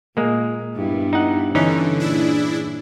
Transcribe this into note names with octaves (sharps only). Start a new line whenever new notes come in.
A#2 G#3 A#3
G2 B3 E4
D#4 F#5
D3 E3 C#4 D#4
A#2 D4 E4 G#4